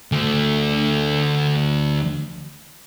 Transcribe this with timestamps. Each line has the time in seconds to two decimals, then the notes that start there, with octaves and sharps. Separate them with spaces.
0.12 D2 A3